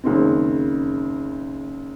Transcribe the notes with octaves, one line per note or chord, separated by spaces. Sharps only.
F#1 C#2 D#3 C4